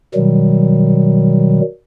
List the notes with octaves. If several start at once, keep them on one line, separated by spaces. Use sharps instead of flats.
B2 D#3 F#3 G3